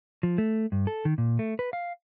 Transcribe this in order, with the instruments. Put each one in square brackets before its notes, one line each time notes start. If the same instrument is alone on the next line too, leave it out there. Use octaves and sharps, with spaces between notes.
[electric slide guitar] F3
A3
G2
A4
D#3
A#2
A3
B4
F5